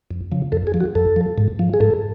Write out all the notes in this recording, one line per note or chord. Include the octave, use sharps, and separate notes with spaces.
F2
C#3 F3
F2 A4
G#4
F3
F#4
F2 A4
F3
G#2
F3
G#4
G#2 A4